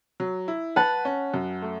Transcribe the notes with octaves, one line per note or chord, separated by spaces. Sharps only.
F#3
E4
B4 F#5 A5
C#4
F#2
A3